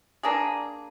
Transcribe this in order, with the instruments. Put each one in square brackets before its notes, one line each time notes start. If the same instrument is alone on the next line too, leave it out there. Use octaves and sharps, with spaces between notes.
[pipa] A#3 D4 G#4